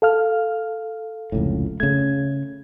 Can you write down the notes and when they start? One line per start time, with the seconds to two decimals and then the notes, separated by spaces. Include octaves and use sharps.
0.02 A4 F5 F6
1.32 F1 C#2 A2
1.80 C#3 A3 G#6